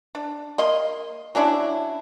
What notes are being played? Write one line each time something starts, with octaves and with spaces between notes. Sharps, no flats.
D4
A#3 D#5 C6
F#3 C#4 D4 E4